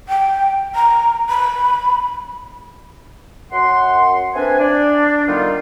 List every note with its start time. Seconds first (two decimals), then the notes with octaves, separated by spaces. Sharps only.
0.09 G5
0.75 A#5
1.29 B5
3.52 F#2 F#5 C6
4.35 A3 C4 D4 B4 G#5
4.59 D4
5.27 D3 D#3 G3 B3 D#4 F4